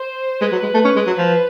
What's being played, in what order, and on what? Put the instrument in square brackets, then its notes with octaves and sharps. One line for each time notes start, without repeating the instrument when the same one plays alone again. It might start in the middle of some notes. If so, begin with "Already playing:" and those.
Already playing: [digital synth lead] C5
[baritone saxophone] G#3 [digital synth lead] B4
[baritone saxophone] F#3
G#3
A3
C#4
G#3
F#3
F3